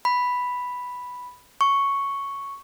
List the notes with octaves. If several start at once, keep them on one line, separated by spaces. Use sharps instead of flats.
B5
C#6